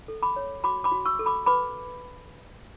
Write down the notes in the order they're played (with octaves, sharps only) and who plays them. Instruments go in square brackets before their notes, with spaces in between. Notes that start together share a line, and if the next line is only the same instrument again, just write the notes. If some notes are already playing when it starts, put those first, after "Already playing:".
[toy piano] A4
B5 D6
C#5
F#4 B5 D6
B5 D6
F#4
C#6 E6
A4
B5 D6
B4 B5 D6